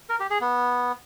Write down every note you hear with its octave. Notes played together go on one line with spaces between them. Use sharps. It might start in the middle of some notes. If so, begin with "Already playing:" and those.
A#4
G4
G#4
B3